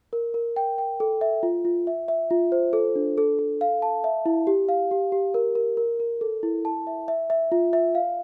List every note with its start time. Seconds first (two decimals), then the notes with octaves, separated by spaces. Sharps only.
0.13 A#4
0.34 A#4
0.56 G5
0.78 G5
1.00 A4
1.21 E5
1.43 F4
1.65 F4
1.87 E5
2.08 E5
2.31 F4
2.52 C5
2.73 A4
2.95 D4
3.18 A4
3.39 A4
3.61 F5
3.82 A5
4.04 E5
4.26 E4
4.47 G4
4.69 F5
4.91 G4
5.12 G4
5.34 A#4
5.55 A#4
5.77 A#4
6.00 A#4
6.21 A4
6.43 E4
6.65 A5
6.87 E5
7.08 E5
7.30 E5
7.52 F4
7.73 E5
7.95 F5